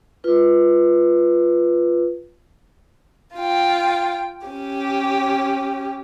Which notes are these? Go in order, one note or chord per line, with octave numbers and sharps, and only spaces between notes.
F4 B4
F4 G5
C#4 G4